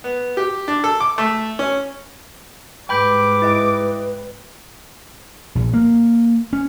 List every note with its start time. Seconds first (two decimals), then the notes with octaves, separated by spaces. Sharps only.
0.04 B3
0.37 G4
0.68 D4
0.84 A4
1.00 D6
1.18 A3
1.59 C#4
2.89 G#2 G3 B4 G5 B5 D6 G6
3.42 E4 D#5 G5
5.55 A#1
5.73 A#3
6.53 C#4